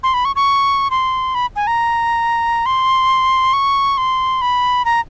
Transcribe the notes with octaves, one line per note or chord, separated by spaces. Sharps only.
C6
B5
C#6
C#6
C6
B5
G#5
A#5
C6
C#6
C6
B5
A#5